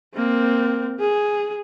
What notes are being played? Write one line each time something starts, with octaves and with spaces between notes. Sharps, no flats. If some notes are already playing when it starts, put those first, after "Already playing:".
A#3 C4
G#4